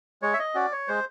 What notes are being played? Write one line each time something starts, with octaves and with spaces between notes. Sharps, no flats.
G#3 C#5
E5
D#5
C#4 F#4 D5
C#5
G#3 C5